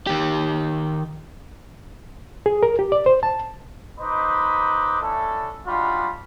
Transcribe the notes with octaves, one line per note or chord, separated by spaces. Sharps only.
D#3 G4
G#4
A#4
G4
D5
C5
A5
D#4 B4 C5 D#5 B5 D6
A3 C#4 D4 E4 A4
G3 D4 D#4 F4 F#4 B5